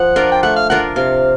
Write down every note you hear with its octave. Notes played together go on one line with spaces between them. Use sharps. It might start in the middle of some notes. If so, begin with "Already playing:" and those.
Already playing: F3 F#5
D4 F4 A#4
G5
A3 F#5
F5
D4 F4 A#4 F#5
C3 F5